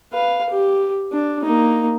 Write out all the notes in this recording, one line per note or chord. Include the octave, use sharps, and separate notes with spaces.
B4 F5
G4
D4
A#3 D#4